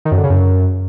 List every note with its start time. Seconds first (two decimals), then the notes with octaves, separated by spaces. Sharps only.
0.05 D#3
0.11 F#2
0.18 D3
0.24 C#3
0.30 F#2